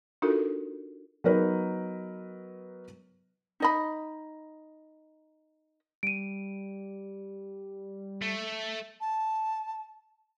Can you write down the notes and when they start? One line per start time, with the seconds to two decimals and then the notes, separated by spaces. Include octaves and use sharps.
0.22 D4 D#4 F4 F#4 A4 A#4
1.24 F#3 B3 D#4 A#4 B4
3.60 D#4 D#5 B5
6.03 G3 D7 D#7
8.22 A3
9.01 A5